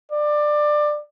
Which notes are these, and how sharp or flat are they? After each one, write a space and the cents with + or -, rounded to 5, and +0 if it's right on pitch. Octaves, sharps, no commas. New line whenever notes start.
D5 +20